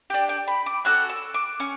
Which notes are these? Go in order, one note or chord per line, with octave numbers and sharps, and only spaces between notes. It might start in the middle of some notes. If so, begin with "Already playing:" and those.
D4 G4 G5
G5
B5
D6
C#4 F#4 A4 F#6
E6
D6
C#4 C#6